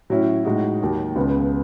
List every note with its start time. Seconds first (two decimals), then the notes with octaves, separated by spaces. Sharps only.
0.10 A2 F#3 C#4 E4
0.45 A2 G#3 D#4 F#4
0.81 D#2 D#3 F#3
1.16 C#2 C#3 G#3 B3